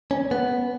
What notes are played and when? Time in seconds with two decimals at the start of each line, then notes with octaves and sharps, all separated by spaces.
0.11 C#4
0.31 B3